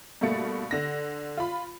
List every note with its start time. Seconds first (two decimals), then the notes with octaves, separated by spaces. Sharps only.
0.21 G2 B2 A3 A#3 A6 C#7
0.71 D3 A#6
1.37 F4 B5